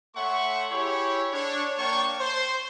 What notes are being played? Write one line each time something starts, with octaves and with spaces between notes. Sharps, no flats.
A3 C#5 E5 F#5 C6 C#6
E4 G4 G#4 C#5
D4 C#5
A#3 D4 C#5 G5 A5 C#6
C5